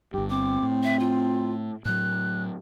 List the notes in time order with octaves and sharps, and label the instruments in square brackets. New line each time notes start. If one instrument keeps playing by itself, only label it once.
[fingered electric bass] G1 G2 [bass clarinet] G4
[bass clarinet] C4 [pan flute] D6
[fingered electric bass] A2
[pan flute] E5
F4
[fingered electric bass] A2 F#3 [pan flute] F#6